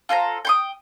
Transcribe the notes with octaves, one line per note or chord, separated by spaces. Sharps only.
F4 A4 C5 A#5
G5 C6 D#6